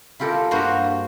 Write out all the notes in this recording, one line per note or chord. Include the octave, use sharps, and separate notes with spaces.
E4 F4 G4 A4 A#4
G2 A#3 F#4 C5 A#5